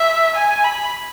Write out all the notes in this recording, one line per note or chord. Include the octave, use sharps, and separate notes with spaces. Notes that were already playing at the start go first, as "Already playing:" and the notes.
Already playing: E5
G#5
B5